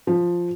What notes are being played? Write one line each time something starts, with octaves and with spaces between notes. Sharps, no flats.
F3